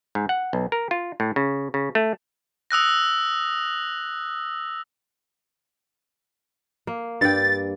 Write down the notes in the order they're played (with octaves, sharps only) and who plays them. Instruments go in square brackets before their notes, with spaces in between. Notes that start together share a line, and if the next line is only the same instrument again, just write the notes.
[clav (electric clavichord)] G#2
F#5
B1
A#4
F4
A2
C#3
C#3
A3
[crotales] D#6 E6 F#6 A#6
[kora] A#3
[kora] G2 D5 G5 [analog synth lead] A6